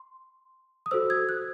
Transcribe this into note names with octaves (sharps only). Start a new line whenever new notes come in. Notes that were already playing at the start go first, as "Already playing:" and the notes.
Already playing: C6
D#6
F#4 A4 C5 E6
G#6
F#6